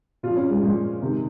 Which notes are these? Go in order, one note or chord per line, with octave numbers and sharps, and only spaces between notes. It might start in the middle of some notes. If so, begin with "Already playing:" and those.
A#2 F3 F4
C#4
G#3
A#2 F3 G#3
C3 D#3